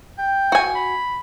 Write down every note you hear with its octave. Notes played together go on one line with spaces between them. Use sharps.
G5
F#4 G#5
B5